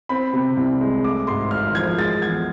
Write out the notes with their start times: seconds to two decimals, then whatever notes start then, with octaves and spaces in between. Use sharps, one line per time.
0.09 C4 B5
0.33 C3
0.57 C2
0.81 G#3
1.04 A3 D6
1.27 G#2 C6
1.51 G#1 F6
1.75 F3 G#6
1.98 G#3 A6
2.22 E2 G#6